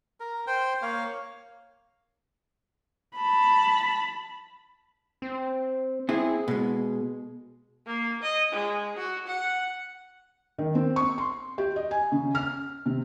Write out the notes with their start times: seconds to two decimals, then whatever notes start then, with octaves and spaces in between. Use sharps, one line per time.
0.20 A#4
0.47 C5 G5
0.82 A#3 C#5 F5
3.16 A5 B5
5.22 C4
6.09 C4 E4 G#4
6.48 B2 G#3
7.86 A#3
8.22 D#5
8.52 G#3
8.96 F#4
9.27 F#5
10.58 D#3
10.75 C4
10.96 C#6
11.18 C6
11.58 G4
11.76 D#5
11.91 G#5
12.12 C#3
12.35 F6
12.86 C3